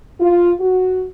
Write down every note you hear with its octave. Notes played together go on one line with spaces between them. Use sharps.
F4
F#4